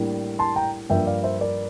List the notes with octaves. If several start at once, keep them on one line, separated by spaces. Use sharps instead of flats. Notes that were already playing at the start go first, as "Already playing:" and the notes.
Already playing: A2 G3 A#3 D4
A5 C6
G5 A#5
G2 F3 A#3 D4 E5 G5
D5 F5
C5 E5
A#4 D5